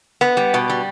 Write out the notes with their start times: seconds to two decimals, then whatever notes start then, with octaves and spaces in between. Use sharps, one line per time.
0.21 B3
0.37 G3
0.54 B2
0.69 G3